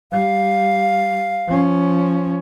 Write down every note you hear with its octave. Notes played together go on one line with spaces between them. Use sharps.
G3 F5
F3 C#4